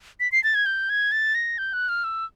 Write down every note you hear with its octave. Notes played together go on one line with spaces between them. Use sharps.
B6
C7
A6
G#6
G6
G#6
A6
A#6
G6
F#6
F6
E6